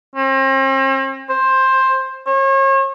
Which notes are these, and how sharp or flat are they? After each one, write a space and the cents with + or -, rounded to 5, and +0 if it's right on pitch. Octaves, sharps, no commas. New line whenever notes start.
C4 +45
C5 +10
C#5 -40